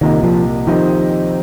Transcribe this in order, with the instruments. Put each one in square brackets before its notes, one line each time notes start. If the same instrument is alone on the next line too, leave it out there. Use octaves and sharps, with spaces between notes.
[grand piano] C2 A#2 A#3 G4 D#5 [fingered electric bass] D#3
[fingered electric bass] F3
[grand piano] D#3 C4 D#4 G4 D#5 [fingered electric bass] F3